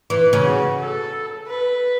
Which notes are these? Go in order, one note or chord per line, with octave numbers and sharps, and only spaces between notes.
E3
C#3
F#4
A4
B4